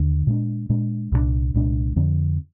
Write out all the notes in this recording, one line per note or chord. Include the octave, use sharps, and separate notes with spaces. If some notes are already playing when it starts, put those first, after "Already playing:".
Already playing: D#2 D3 D4
A#2 G#3 D4
A#2 G#3 D4
C2 A#2 G#3 D4
C2 A#2 G#3 D4
F2 D3 F3 C4